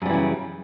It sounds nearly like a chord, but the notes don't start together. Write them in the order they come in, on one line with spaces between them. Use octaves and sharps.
F#2 G3 E3 C#3